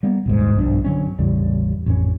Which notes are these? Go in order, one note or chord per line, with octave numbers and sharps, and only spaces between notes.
G3 A#3 B3
D#1 C2 G#2
B1 G2 F3 D4
D3 F#3 C#4
A1 E2 C#3 G3
A1 F2 C#4